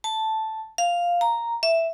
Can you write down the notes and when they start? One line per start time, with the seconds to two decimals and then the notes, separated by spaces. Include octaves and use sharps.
0.04 A5
0.78 F5
1.21 A#5
1.63 E5